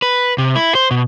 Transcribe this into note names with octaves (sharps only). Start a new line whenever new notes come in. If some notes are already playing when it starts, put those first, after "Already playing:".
B4
C3
E4
C5
B2